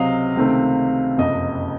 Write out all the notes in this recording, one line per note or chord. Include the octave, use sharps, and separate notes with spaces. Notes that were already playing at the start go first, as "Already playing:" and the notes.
Already playing: C#2 C3 F#3 C4 D#5 F5
C#2 C3 D#3 A3 C4
F#1 F2 C3 D#5